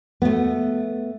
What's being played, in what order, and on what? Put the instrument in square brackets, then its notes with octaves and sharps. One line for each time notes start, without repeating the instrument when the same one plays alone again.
[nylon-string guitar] A3 B3